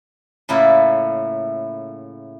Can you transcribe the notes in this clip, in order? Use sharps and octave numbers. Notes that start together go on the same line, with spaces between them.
A2 C#3 A#3 E4 F4 D5